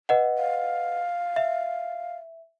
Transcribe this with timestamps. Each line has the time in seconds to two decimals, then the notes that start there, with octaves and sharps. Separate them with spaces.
0.09 B4 D#5 F#5
0.38 F5
1.36 E5